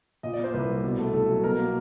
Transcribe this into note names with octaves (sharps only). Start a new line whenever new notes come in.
A#2 D#5
D5
A#3 C5
C2 B4
G3
B2
A3
C2 A4
F#3
B2 A#4
A#3